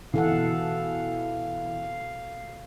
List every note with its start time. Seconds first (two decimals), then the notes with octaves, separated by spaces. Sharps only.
0.14 B2 E3 A4 F5 F#5